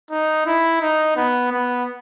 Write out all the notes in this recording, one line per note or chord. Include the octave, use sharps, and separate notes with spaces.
D#4
E4
D#4
B3
B3